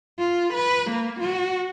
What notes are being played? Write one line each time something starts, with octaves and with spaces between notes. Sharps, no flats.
F4
B4
A#3
F#4